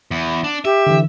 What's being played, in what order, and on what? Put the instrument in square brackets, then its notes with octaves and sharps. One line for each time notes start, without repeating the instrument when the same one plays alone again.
[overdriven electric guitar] E2
D4
[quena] G4 [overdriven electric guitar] E5
[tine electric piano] D3 E3